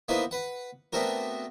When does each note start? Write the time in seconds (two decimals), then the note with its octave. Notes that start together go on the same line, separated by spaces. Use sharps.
0.08 A#3 B3 D#4 E4 B4 C5
0.31 B4 F#5
0.93 A3 B3 C4 D4 F#4 A#4